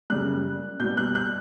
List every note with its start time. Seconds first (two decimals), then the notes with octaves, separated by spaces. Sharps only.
0.10 F#2 C#3 G3 F#6
0.80 B2 G3 G6
0.97 F#6
1.15 F#6